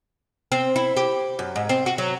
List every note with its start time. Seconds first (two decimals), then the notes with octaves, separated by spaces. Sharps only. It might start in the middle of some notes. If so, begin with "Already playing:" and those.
0.52 C4
0.76 E4
0.97 G4
1.39 F#2
1.56 G#2
1.69 C4
1.86 F#4
1.98 F#3